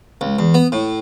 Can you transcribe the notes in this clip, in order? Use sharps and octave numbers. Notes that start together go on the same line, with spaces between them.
C#2
E2
B3
A2